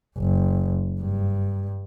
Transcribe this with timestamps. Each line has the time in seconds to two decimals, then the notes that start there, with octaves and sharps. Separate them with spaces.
0.18 F#1
1.01 G2